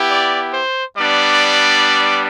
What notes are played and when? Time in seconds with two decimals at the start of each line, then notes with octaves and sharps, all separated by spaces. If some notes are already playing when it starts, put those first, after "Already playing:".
Already playing: B3 E4 G4
0.09 D5
0.53 C5
0.96 G3 B3 D4 D5